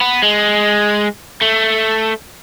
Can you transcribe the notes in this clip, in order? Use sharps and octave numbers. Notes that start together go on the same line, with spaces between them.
B3
G#3
A3